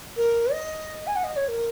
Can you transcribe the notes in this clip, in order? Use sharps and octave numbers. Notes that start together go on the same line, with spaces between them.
A#4
D#5
G#5
F#5
D#5
C#5
A#4